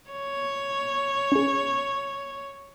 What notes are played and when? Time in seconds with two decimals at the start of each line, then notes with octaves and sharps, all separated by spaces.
0.10 C#5
1.32 C#4 G#4